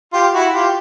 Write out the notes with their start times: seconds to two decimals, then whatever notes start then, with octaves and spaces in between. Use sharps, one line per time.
0.13 F4 G4
0.34 E4 F#4
0.54 F4 G4